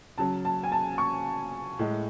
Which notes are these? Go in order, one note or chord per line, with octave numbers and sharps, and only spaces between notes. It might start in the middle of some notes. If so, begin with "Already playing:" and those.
C#3 F#3 A5
A5
G#5
A5
C#6
A2 G#3